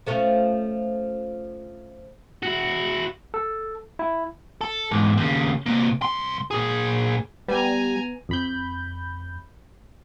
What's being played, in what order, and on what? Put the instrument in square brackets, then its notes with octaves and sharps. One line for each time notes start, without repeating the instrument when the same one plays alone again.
[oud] F3 A3 C#4
[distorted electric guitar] E4 F#4
[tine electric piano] A4
E4
[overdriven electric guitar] A4
E2 G#2
D#2 C#3
C3 A#3
C2 C6
A#2 G#4
[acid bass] G3 [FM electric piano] B3 [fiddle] G#5 A#5
[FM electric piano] F2 B5 G6